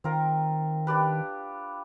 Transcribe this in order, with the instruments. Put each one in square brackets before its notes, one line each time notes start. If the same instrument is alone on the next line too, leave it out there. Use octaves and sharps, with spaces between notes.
[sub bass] D#3 [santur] C4 F4 A#4
[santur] D4 G4 B4